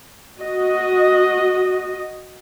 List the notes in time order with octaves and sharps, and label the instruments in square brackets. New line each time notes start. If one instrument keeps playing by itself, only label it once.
[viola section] F#4 D#5